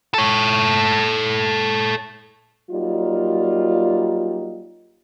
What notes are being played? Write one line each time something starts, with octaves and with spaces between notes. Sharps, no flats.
A4 C#5
F#3 G3 A#3 D#4 F4